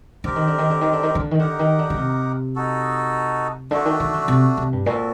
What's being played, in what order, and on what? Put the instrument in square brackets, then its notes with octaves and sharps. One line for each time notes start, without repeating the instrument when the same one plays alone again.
[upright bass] D3 [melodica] C4 G4 A#4
[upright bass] D#3
D3
D#3
D3
D#3
D3
D#3
D3
D#3
[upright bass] D3 [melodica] D#4 G4 A#4 F#5
[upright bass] D#3
D3
D3
C3
[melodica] D#4 F#4 A4
[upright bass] D3 [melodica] A3 D4 F#4
[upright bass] D#3
D#3
D3
C3
C3
G2
[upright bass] A#2 [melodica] C4 F#4 A4